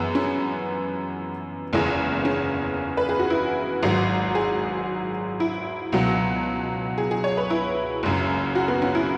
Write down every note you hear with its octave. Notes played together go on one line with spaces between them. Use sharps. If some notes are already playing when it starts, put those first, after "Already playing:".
Already playing: F#2 E3 G#3 B3
C#4
F#1 E2 C#3 E3 G#3
C#4
B4
G#4
F#4
E4
G#1 G#2 F#3
G#4
E4
C#2 B2 F#3
G#4
G#4
C#5
B4
E4
F#1 F#2 C#3
F#4
B3
C#4
E4